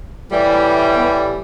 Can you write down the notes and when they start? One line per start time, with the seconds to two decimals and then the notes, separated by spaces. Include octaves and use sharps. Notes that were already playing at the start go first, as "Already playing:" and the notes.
0.30 A2 E3 G3
0.94 B3